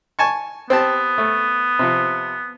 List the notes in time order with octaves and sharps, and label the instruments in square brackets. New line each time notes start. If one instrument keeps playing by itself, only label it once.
[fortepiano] G#5 A5 C#6
[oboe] B3 [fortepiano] C4 G4 A5
[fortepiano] A3
C3 F3